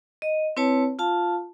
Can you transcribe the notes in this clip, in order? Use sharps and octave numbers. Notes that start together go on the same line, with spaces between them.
D#5
C4 E4 B4 C#5 A5
F4 F5 A5